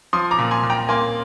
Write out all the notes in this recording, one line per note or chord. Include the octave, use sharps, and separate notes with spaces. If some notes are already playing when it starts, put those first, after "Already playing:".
F3 C6 D#6
A#5 D6
A#2
G#5 C6
A#2
G5 A#5
A#3 G#5 C6